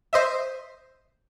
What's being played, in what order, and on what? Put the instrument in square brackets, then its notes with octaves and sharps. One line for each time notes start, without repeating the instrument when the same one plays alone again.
[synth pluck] C5 D#5 E5